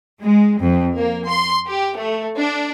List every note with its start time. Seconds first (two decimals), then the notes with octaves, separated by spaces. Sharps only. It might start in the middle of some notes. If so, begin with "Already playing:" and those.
0.22 G#3
0.60 F2
0.97 A#3
1.28 C6
1.67 G4
1.97 A3
2.37 D4